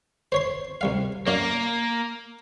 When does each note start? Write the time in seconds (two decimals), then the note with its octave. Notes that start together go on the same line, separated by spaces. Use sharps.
0.32 C5 C#5 C6
0.81 C2 G3 F5
1.27 F#2 A#3 D5 F5